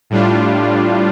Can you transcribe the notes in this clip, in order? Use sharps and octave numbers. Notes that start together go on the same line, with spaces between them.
A2 G3 D4 F4